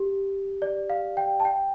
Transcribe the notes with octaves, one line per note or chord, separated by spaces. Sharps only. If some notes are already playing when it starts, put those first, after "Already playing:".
Already playing: G4
D5
F5
G5
A5
G5